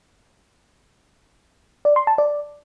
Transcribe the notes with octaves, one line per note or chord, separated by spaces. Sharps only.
D5
C6
A5
D5